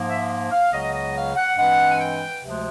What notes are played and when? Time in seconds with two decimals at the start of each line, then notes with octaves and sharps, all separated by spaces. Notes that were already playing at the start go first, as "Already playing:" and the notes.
Already playing: G#2 F3 A#3
0.08 E5
0.51 F5
0.72 C#2 C#3 F#3 B3 D#5
0.94 D#5
1.15 F5
1.36 F#5
1.56 G2 E3 G#3 C4 F#5
1.90 G#5
2.00 G5
2.41 D2 C3 F3 G#3